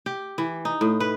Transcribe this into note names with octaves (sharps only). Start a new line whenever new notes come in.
G4
E3
D#4
A2
B4